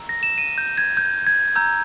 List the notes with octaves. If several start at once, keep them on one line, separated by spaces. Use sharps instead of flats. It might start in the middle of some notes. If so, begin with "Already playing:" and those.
Already playing: A#5 E6
A#6
E7
D#7
G6
G#6
G6
G#6
A#5 E6 G6